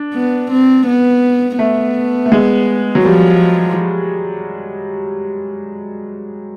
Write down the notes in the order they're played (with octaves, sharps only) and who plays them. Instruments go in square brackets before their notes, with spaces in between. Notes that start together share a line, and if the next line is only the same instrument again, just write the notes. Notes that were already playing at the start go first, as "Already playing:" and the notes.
Already playing: [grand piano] D4
[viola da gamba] B3
C4
B3
[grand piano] A3 [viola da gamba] B3
[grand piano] A3
G#3
F#3
[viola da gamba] F3 [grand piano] G3